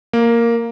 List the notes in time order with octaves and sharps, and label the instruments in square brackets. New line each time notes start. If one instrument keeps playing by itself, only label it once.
[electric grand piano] A#3